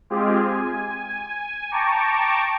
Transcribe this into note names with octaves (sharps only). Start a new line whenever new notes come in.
G#3 C4 F4 G4 G#4
G#5
G5 A5 A#5 C#6 D6